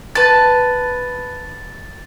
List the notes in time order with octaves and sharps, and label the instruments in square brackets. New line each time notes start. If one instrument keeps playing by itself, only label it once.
[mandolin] B4 A5 [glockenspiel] A6